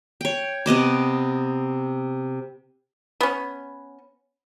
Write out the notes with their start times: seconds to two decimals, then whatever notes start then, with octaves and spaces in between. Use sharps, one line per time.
0.21 C#5 G5
0.66 C3 B3 D#5 D6
3.21 B3 C#4